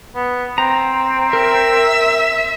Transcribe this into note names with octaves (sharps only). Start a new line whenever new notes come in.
B3
C4 A#5
A#4 E5